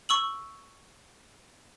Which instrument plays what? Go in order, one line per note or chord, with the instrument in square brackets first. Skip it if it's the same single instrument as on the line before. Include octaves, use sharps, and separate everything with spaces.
[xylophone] C#6 E6 F#7